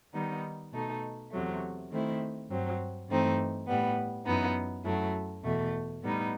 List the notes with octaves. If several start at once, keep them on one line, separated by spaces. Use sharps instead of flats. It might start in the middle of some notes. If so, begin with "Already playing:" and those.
D#3 G3 B3 D#4
B2 A3 D#4
E2 C3 F#3 A3
D#3 A3 C4 E4
G2 F#3 C4
G2 E3 A3 C4 D#4
A2 G3 B3
F#2 E3 B3 D#4
F#2 F#3 A3 E4
E2 B2 A3
A2 G3 B3 D#4